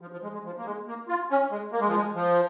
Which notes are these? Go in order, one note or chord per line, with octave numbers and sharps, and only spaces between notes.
F3
F3
G#3
G#3
F3
A#3
G#3
A#3
F4
C#4
G#3
A#3
G#3
F3
G#3
F3